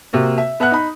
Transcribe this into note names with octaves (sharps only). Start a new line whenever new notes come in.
C3 A#3 F#4
E5
B3 E5 F#5 F#6
D#4 B5